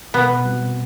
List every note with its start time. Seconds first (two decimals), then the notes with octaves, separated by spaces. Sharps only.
0.14 B2 B3
0.44 G3 C4 F#4